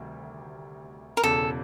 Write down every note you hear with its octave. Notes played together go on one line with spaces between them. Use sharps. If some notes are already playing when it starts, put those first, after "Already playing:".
Already playing: D2 C3 D#3 G3
A#4
E1 E2 C#3 A4